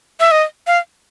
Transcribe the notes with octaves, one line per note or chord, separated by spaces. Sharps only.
E5
D#5
F5